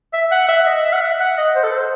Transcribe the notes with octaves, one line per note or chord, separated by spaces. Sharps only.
E5
F#5
E5
D#5
E5
F#5
E5
F#5
D#5
C5
A4
C5